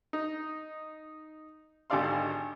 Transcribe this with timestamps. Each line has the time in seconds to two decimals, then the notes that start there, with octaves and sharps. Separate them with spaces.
0.13 D#4
1.90 G#1 D3 G4 D5 F5 C6